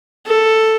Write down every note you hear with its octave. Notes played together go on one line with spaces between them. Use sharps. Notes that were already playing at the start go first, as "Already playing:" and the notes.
A4